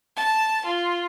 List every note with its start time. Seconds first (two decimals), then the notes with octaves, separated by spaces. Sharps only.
0.16 A5
0.64 F4